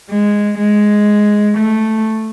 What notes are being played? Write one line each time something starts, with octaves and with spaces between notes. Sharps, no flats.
G#3
G#3
A3